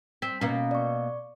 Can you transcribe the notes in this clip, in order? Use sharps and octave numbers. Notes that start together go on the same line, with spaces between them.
C4 B6
B2 A#3 C#4
D5 C#6